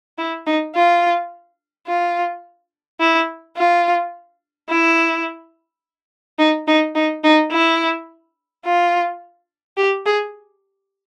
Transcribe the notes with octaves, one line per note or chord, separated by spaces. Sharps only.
E4
D#4
F4
F4
E4
F4
E4
D#4
D#4
D#4
D#4
E4
F4
G4
G#4